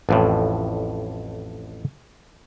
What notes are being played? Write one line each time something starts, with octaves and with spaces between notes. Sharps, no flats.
A1 F2 A2